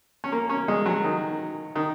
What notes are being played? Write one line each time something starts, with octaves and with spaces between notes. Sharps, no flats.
C#4
A#3
C#4
G#3
F#3
D#3
D#3